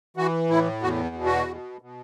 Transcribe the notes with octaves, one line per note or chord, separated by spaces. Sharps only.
E3 F#4
A2 E4
E2 F#4
B2
F#4
B2
B2